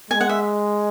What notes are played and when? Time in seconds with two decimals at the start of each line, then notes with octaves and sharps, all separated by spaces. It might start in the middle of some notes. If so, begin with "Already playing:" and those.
0.10 G#3 G#5
0.21 F#5
0.29 E5